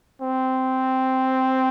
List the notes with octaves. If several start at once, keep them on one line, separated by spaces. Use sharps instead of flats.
C4